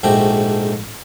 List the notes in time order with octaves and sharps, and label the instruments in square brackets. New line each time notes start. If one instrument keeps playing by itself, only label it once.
[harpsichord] A#1 G#2 A3 F#4 G4 G5